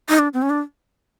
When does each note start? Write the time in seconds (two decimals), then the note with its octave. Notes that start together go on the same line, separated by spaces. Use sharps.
0.09 D#4
0.19 D4
0.34 C4
0.42 C#4
0.50 D4